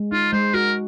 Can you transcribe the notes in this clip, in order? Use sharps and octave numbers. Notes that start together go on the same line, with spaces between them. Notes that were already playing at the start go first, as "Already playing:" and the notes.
Already playing: G#3
D#4 F4
G#3 C5
F#4 A#4